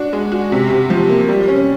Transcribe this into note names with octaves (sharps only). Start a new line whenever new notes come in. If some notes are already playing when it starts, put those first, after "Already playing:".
Already playing: D4 F#4
G#3
F#4
C3
C3
F3
A#3
G3
C#4